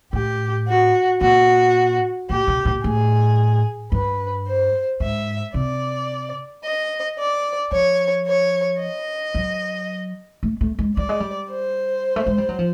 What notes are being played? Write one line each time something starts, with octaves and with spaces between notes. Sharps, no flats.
A2 G4
F#4
A#2 F#4
A#2 G4
B2
A#2
A2 G#4
G2 B4
C5
G#2 E5
C3 D5
D#5
D5
F3 C#5
C#5
D#5
F#3
A3
A3
G#3
G3 D5
G#3
G3
C5
A3
G#3
G3
F#3
F3